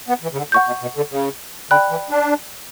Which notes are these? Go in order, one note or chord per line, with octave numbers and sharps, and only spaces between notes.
B3
E3
C#3
D3
A#2 F#5 C#6 G6
B2
B2
D3
C#3
D3 D5 G5 B5 F#6
E3
D4